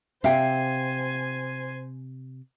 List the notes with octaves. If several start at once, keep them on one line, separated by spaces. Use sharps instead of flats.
C3 C5 E5 F5 G5 G#5